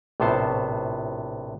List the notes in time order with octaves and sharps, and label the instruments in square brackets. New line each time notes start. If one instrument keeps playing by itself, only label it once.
[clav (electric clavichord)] A#1 A2 C3 B3 C5 A5